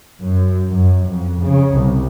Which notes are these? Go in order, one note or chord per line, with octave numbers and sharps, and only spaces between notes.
F#2
F#2
F2
C#3
C2